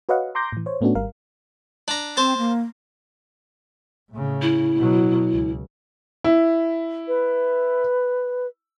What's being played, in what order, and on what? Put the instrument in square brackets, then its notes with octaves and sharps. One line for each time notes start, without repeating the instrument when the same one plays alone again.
[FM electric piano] F#4 B4 C#5 D#5 F5 F#5
A#5 C6 D6 G6 A#6
A2 E3
C5 C#5
A2 A3 B3 C#4 D4 F#4
G#1 G3 A#4 F5
[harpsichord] D4 A#5
[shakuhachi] C4 [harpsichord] C5 A5
[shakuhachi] A#3
[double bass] A2 C#3
[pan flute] E4
[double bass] B2 F#3
C#2
[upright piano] E4
[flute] B4